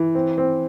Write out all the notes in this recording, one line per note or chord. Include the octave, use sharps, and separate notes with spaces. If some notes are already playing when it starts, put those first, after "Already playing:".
Already playing: E3
C4
C4